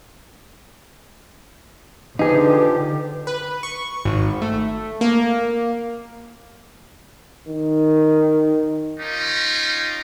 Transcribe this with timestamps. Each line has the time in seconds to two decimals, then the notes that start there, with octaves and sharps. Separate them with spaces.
2.19 D3 F3 D#4 G4 G#4 B4
3.27 B4
3.63 C#6
4.05 G#1
4.42 A3
5.01 A#3
7.48 D#3
8.99 C#4 D#4 F4 G4